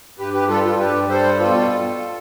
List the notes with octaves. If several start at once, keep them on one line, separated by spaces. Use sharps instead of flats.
G2 G4 B4
G4 B4
G3 F4 A4
F4 A4
G2 G4 B4
G3 A4 C5
B2 F4 A4
B2